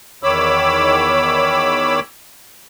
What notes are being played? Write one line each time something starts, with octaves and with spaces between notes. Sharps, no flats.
E2 D#3 C#5 B5 D6 E6